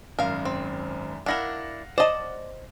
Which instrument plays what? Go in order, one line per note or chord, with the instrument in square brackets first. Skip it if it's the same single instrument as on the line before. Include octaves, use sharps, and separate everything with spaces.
[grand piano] G#1 F#2 [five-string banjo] A#4 F5
[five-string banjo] C4
[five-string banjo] D4 E4 A#4 [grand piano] F5 F#5 A#6
[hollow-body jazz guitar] C5 D#5 [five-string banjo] D5 A5